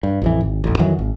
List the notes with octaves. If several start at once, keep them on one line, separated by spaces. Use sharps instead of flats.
G2
A1 F2 E3
G#1
D#1 A1
F2 D#3 E3 F#3
G#1